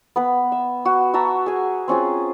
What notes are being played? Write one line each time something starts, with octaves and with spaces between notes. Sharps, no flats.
B3 B4
E5
F#4
F#4 E5 A5 A#5
G#4 G#5
C4 C#4 F4 G#4